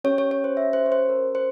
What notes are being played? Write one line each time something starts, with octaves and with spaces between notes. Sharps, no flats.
C#4 G4 C#5
C#5
C#5
C5
E5
C5
C#5
C5
A#4
C5